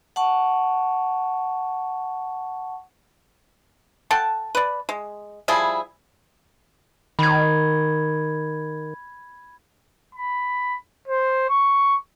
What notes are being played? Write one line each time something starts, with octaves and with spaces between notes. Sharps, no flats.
F#5 A5 C#6
A4 F#5 G5 A5
B4 D5
G#3
F3 G3 E4 G#4
D#3 B5 G#6
B5
C5
C#6